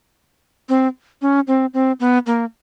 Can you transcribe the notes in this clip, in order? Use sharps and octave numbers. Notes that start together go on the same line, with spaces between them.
C4
C#4
C4
C4
B3
A#3